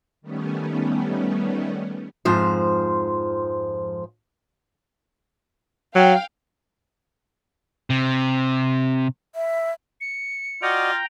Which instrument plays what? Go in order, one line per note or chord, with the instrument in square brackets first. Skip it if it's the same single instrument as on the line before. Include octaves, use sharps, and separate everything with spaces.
[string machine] D#3 G3 A3 B3 C#4
[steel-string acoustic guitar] F2 G#2 F3 C5
[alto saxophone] F#3 [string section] F5 G5
[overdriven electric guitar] C3
[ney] E5
[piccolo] C#7
[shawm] F4 [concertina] F#4 D5 D#5 [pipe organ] G5 A#5